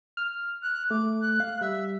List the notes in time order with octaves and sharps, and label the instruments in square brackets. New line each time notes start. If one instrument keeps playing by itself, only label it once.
[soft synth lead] F6
[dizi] F#6
[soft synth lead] A3 [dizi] D6
[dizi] F#6
[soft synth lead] F5
[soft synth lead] G3 [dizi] E5